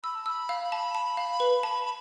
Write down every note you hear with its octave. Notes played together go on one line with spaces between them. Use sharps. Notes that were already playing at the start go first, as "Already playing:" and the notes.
B5 E6
A5
B5 E6
F5
A5
A5
F5
B4
A5
B5